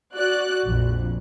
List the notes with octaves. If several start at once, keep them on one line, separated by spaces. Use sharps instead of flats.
F#4 D5 F#6
A#1 F2